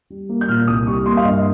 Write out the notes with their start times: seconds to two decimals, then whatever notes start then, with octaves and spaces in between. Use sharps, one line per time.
0.10 G3
0.29 A#3
0.41 G6
0.48 A#2 F6
0.67 C2 D#6
0.87 G3 C#6
1.06 A#3 C6
1.17 F5
1.24 G2 D#5